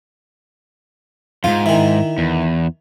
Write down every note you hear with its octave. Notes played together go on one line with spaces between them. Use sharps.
F2 G#2 F4
D#3 E3
E2